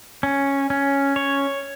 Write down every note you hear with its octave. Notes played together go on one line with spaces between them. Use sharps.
C#4
C#4
C#5